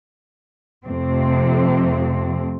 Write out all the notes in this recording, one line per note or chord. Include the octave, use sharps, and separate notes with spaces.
F2 C3 A3 C4